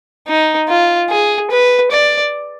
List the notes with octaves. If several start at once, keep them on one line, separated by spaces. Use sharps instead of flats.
D#4
F4
G#4
B4
D5